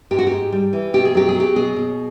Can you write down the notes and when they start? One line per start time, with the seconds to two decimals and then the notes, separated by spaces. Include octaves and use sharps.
0.11 G#2 G4
0.19 F#4
0.27 G#2 G4
0.52 G3
0.73 E3
0.94 B2 G4
1.05 G#4
1.14 F#3 G4
1.29 G#4
1.35 F#3
1.40 G4
1.56 B2 G#4
1.76 B2